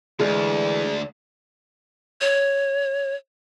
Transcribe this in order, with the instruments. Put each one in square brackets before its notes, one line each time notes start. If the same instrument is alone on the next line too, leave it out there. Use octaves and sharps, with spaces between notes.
[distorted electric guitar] D2 [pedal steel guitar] D3 E3 F6 [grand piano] G#3 [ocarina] D5
[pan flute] C#5